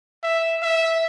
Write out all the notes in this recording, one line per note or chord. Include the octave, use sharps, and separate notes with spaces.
E5
E5